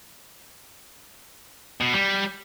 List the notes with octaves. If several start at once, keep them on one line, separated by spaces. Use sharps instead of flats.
B2
G3